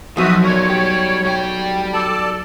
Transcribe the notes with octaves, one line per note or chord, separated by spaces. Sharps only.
B1 F3 F#4 E5 D#6
A#4 C#5 D5
G3 G4
G3 G5
A4 D5 A5